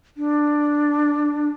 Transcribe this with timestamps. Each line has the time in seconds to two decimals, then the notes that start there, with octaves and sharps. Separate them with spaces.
0.17 D4